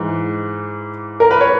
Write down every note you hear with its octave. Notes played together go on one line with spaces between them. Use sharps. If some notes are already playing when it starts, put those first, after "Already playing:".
Already playing: G#2 E3
A#4
B4
C#5